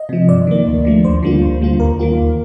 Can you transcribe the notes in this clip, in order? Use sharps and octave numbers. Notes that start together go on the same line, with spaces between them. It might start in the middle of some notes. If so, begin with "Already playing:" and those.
Already playing: D#5
C3 F3
G2 D5
D#3 A#3
D2
D3 F3 A3
D#2 C5
D3 G3 A#3 F4
D2
D3 G3 A#3 F4
D#2 A#4
D#3 A#3 F4
D#2